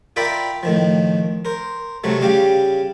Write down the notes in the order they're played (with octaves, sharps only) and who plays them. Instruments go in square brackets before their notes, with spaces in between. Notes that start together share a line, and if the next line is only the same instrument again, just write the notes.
[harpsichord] F4 A#4 D5 E5 G5 B5
A2 D#3 F3
A#4 C5
C3 F#3 A3
C#3 G3 G4 F5